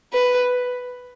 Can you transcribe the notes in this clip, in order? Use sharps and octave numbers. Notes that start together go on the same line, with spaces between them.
B4